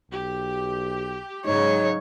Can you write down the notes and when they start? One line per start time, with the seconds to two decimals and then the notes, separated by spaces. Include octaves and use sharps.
0.11 B1 G4
1.45 G#2 C#3 F#3 D#4 C#5